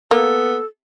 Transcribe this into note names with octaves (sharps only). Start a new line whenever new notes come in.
A#3 B3 A4